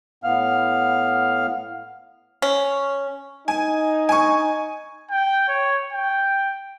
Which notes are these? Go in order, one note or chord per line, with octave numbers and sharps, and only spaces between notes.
A2 B3 F5 F6
C#4
D#4 G#5
G#5 C#6
G5
C#5
G5